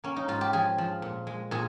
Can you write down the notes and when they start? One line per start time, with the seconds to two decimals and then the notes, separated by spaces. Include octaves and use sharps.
0.04 A#3 C#4
0.16 D#4
0.28 G#2 F4
0.41 G4
0.53 F3 G#4
0.78 F3
1.02 A#2
1.27 G#3
1.51 A#2 G#4